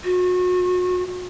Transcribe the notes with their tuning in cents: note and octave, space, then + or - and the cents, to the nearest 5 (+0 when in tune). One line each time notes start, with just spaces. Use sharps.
F#4 -35